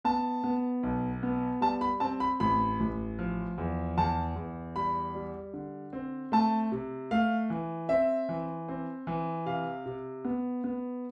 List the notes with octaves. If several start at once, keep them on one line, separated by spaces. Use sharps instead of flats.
B3 A5
B3
B1
B3
G3 A5
B5
C4 A5
B5
A1 B5
A1
F3
E2
E2 A5
E2
G3 B5
G3
D3
C4
A3 A5
C3
A3 F5
E3
C4 E5
E3
C4
E3
C3 F5
C3
B3
B3